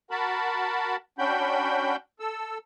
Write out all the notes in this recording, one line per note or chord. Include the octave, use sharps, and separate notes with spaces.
F#4 A#4 A5 B5
C#4 D4 F#4 G5 B5 G6
A4 E6